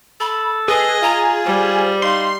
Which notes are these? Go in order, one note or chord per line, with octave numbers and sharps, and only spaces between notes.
A4 B5
G#4 B4 D#5
F4 A#5
G3 C5
D#4 F5 C6